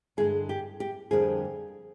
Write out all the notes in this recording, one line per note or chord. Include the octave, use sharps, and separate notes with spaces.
G2 D3 G#3 G#4
G4
G4
F2 D3 G3 A#3 G#4